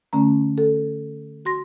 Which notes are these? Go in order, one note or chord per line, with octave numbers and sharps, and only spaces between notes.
D3 A3 C#4 A#5
A4
F#4 C6 A#6